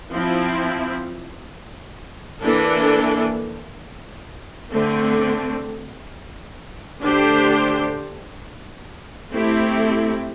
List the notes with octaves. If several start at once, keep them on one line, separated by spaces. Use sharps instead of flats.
F3 C4 E4
E3 A#3 D4 A4
D3 A3 C4
D3 A3 D4 G4 C5
A3 C4 E4 G4